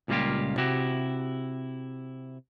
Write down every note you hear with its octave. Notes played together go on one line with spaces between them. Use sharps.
C#2 A#2 G3 A#3 F4 G4
C3 E4 F#4 G4